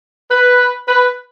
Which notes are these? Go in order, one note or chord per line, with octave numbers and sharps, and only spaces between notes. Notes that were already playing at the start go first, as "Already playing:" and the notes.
B4
B4